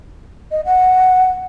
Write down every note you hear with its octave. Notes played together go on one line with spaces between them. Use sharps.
D#5
F#5